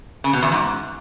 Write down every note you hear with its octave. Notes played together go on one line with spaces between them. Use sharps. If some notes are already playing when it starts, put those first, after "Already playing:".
C#3
B2
E2
G#2